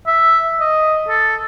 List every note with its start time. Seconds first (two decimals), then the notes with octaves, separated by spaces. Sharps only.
0.07 E5
0.60 D#5
1.08 A4